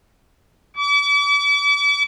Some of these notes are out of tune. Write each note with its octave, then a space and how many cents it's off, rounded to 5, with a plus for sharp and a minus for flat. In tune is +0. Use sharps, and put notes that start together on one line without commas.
D6 -40